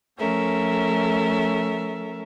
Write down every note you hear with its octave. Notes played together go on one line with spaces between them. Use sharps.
F3 A3 C#4 A4 A#4 E5